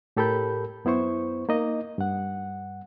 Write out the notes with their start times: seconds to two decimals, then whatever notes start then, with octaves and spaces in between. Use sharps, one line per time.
0.17 A2 G4 A4 A#4 B5 G6
0.85 F#2 B3 E4 C5 C#6
1.49 A#3 D#4 D#5
1.98 G2 F#5